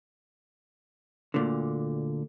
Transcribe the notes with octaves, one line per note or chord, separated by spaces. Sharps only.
D2 A#2 D3